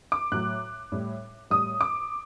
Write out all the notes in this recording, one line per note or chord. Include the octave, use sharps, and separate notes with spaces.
D6
A2 F#3 F#6
A2 G3
A2 G3 D#6
D6